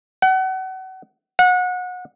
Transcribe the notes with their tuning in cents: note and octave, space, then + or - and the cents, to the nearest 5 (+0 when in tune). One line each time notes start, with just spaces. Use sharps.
F#5 +30
F#5 -30